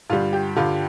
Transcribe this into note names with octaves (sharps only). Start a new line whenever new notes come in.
G2 D3 G3 F4
G4
G2 D3 G3 F4